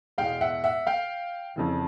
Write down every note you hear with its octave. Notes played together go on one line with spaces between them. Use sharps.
E2 B2 G#3 F5 G5
E5 F#5
E5 F#5
F5 G5
F2 C#3 E3